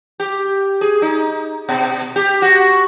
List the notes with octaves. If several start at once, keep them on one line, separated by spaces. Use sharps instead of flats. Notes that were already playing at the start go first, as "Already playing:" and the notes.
G4
G#4
D#4
B2
G4
F#4